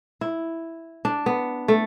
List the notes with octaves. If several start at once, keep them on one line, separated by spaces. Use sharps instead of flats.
E4
D4
B3
A3